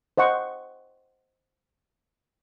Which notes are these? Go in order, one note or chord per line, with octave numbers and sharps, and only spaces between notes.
C5 D#5 F#5 C#6